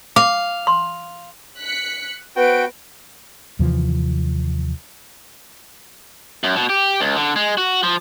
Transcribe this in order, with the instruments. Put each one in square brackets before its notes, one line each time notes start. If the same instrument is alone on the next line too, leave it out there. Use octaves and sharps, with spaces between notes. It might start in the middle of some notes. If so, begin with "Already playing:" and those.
[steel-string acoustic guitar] F5 [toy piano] D6
[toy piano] C6
[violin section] F#6 B6 C#7
[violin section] B3 C5 D7 [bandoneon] F#4 G5 [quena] B4
[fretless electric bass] D#2 C3 E3 F3
[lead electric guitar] F#2
B2
G4
C#2
D3
G#3
F#4
F3